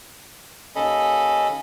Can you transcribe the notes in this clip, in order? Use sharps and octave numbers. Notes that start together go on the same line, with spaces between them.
D#2 C#4 A4 D#5 B5